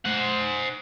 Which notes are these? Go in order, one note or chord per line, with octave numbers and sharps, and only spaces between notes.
C5 F#5